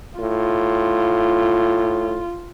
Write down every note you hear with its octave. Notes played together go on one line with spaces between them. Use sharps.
A2 F4